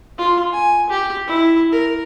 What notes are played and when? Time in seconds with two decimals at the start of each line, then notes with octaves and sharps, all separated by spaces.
0.18 F4
0.53 G#5
0.90 G4
1.27 E4
1.72 A#4